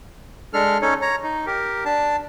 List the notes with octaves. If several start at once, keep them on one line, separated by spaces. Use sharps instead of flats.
G#3 D4 A4 F6
C#4 D#4 A4 C#5
C#5 A#5
D#4
G4 A#4
D4 A5